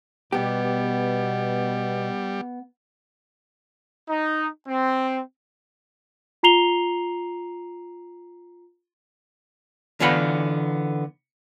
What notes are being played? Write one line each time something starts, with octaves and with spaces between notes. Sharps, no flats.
B2 G3 B3 G4
D#4
C4
F4 A#5 C7 F7 G7
D3 E3 B3 F4 F#5 B5